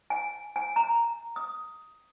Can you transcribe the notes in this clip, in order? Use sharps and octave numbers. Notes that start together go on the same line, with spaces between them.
G#5
G#5
A#5
D#6